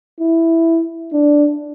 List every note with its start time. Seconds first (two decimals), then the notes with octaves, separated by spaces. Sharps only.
0.21 E4
1.13 D4